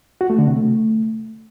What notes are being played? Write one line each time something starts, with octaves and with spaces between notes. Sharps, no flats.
F#4
A3
D3
C3
A3